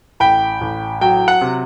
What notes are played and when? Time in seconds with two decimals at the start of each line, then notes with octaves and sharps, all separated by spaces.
0.20 A1 G5 B5
0.61 A1
1.01 F#3 G5
1.28 F#5
1.41 C3